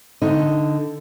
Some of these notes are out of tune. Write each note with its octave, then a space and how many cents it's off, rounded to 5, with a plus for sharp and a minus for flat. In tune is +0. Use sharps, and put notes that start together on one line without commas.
D3 +0 D#4 +0